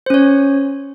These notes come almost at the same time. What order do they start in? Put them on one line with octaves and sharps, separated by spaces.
C5 C#4 C#5